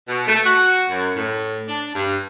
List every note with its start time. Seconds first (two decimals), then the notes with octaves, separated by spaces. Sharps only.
0.08 B2
0.28 A3
0.44 F#4
0.90 F#2
1.16 A2
1.68 D4
1.95 G2